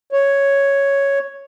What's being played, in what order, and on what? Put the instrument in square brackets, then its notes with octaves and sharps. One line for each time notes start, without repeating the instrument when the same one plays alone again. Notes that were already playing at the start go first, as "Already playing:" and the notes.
[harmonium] C#5